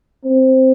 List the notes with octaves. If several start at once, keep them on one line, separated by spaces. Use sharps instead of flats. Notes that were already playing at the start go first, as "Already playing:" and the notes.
C4